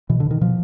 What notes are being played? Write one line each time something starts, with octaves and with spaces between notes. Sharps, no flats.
B2 E3
D3
B2
D#3
B2 F3